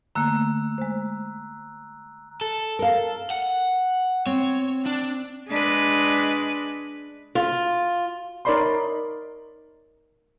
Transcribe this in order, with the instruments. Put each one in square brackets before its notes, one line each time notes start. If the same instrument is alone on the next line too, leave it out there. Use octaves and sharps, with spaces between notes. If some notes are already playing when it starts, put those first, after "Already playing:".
[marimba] D3 A3 A#3 [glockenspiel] A#5 E6 F#6
[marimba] G#3 C5
[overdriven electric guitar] A4
[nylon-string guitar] A#4 F5
[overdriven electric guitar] F#5
[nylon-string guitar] C4 [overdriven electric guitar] C#5
[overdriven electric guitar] D4
[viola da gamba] G#3 D4 B4
[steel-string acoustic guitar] F4
[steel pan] D#4 A#4 C#5 D5 B5 C6